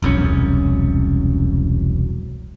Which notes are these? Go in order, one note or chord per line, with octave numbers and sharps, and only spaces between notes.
E1 C2 F#2 C#4